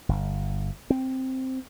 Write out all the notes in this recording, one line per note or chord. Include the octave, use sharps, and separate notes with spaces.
G1
C4